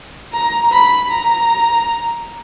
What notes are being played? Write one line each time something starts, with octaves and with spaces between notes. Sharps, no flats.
A#5
B5
A#5